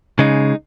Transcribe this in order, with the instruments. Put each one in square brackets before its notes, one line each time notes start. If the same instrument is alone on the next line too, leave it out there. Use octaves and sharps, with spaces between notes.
[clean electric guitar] C#3 G#3 D#4